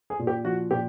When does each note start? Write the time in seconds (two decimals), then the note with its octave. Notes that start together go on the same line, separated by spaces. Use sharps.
0.10 G#4
0.19 A#2
0.27 G4
0.45 F3 F#4
0.71 A#2 G4